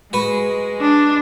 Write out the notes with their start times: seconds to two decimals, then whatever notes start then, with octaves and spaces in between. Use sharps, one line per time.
0.13 G#3 F#4 B4
0.81 D4